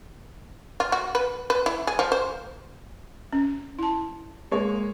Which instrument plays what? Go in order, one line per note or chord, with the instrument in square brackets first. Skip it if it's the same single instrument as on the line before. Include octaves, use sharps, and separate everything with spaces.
[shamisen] F4
F#4
B4
B4
E4
G#4
F3
C5
[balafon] C#4
E4 A5
[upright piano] G#3 A#3 C#5